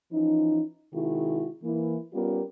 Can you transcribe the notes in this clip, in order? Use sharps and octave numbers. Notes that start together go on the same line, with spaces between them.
E3 F3 C#4 D#4
C3 D#3 G#3 E4 F#4 G#4
E3 A#3 E4
G3 B3 C#4 F4 G4 A#4